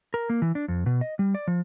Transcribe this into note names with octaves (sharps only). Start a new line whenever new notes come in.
A#4
A#3
E3
D4
F2
B2
D#5
G3
D5
F3